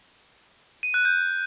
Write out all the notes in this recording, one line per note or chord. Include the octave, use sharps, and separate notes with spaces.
D#7
F#6
G6